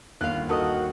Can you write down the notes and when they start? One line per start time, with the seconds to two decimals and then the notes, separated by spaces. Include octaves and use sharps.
0.21 G1 D#2 F4 F5 F#6
0.49 D#3 F#4 A4 A#4 D#5 A5